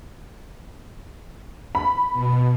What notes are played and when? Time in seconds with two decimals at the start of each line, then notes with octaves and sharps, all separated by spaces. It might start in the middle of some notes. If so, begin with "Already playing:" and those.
1.75 B5
2.13 B2